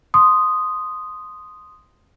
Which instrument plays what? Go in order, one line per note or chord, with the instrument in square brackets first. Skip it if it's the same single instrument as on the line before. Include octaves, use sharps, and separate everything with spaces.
[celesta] C6 D#6